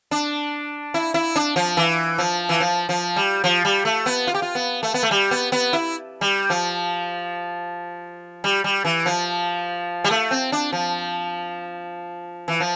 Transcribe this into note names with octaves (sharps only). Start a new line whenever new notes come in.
D4
E4
E4
D4
F3
E3
F3
E3
F3
F3
G3
F3
G3
A3
B3
F4
G4
F4
B3
A3
B3
A3
G3
B3
B3
E4
G3
F3
G3
G3
E3
F3
G3
A3
C4
D4
F3
E3
F3